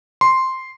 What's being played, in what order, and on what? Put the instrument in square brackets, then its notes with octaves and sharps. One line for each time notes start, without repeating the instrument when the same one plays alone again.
[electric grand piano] C6